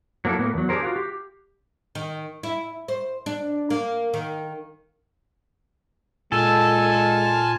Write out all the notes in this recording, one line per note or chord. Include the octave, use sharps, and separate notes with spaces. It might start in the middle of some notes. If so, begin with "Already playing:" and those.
F#3 A#3 D4 E4 A4
A2 A#3 B3
E2 F#3
D4 G4 G#4 A#4 C5
F4 F#4 F5
G4
D#3
E4
C5
D4
A#3
D#3
A#2 G#3 F4 A4 G#5 A5